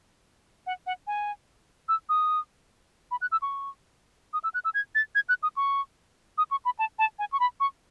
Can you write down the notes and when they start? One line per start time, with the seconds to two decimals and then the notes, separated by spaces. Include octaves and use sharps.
0.66 F#5
0.86 F#5
1.07 G#5
1.88 E6
2.09 D#6
3.11 B5
3.21 F#6
3.32 E6
3.42 C#6
4.33 D#6
4.44 E6
4.54 F#6
4.65 E6
4.74 G#6
4.95 A6
5.15 G#6
5.29 F#6
5.43 D#6
5.56 C#6
6.38 D#6
6.51 C#6
6.65 B5
6.79 A5
6.99 A5
7.19 G#5
7.32 C#6
7.40 B5
7.60 C#6